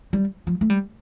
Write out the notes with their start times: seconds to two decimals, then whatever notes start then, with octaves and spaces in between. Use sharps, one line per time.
0.13 G3
0.47 F3
0.61 A3
0.70 G3